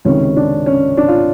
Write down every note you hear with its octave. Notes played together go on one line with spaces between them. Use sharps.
C#2 C3 D#3 C#4
D4
C#4
D4
F4